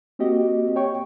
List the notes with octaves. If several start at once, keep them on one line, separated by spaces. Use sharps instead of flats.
A#3 C4 F#4 G4 D#5
C#5 G5 C#6